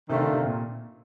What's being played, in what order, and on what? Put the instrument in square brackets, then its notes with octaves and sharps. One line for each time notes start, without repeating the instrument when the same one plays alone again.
[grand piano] C3 [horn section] D#3 A3 D4 F4
[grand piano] D3
C3
A#2